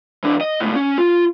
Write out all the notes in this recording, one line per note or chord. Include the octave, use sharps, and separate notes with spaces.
E3 D4
D#5
C#2 A2
C#4
F4